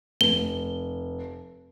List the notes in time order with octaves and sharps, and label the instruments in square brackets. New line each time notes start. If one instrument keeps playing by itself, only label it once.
[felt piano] F1 [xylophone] G7